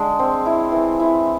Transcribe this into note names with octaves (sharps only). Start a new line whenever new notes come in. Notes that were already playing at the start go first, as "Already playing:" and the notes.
Already playing: D3 G#3 D4
C4
E4
E3
E4